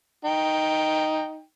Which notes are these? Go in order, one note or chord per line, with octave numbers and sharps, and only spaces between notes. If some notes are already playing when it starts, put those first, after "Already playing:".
D#4 G5